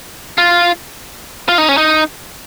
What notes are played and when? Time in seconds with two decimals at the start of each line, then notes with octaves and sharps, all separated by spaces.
0.38 F4
1.49 F4
1.58 D#4
1.69 C#4
1.78 D#4